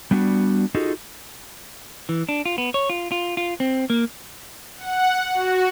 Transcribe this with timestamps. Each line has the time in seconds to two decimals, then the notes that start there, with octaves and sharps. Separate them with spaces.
0.11 G3 B3 D4 F#4
0.75 D#4 F4 F#4 G#4 A4 D#5
2.09 E3
2.29 D4
2.46 F4
2.58 B3
2.74 C#5
2.90 F4
3.12 F4
3.37 F4
3.60 C4
3.90 A#3
4.78 F#5
5.33 F#4